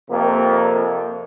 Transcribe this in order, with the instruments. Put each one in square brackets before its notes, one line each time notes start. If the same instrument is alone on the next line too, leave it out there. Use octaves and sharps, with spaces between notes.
[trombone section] F2 C3 A#3